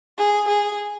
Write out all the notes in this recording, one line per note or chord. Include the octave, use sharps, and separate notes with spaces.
G#4
G#4